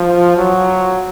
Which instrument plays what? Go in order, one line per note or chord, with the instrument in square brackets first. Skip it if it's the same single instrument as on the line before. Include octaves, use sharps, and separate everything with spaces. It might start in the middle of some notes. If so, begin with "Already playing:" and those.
Already playing: [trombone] F3
F#3